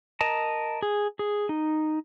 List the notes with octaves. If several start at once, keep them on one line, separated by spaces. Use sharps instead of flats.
A#4 D#5 A5 A#5
G#4
G#4
D#4